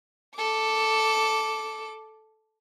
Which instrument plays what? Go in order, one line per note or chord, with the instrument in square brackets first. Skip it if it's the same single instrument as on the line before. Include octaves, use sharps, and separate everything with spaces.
[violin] A4 D6